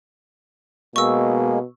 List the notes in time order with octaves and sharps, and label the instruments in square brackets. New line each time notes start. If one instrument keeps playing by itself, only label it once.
[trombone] B2 [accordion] G#3 A#3 [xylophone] C#6 E6